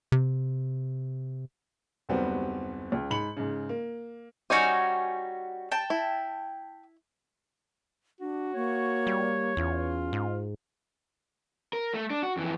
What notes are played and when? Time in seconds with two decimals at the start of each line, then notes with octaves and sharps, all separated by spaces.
0.12 C3
2.09 F#1 D#2 G3 B3 C4 F#4
2.92 C#2
3.10 G#2 B5 C#7 F#7
3.37 G#2 C#3
3.69 A#3
4.50 G3 C#4 D#4 F#4 G#5
5.72 G5 A5
5.90 E4
8.21 D4 F#4
8.55 A#3 C#5
9.07 G3
9.57 E2 C#4 F4
10.13 G#2
11.73 A#4
11.94 A3
12.10 D4
12.23 F#4
12.37 F2 E3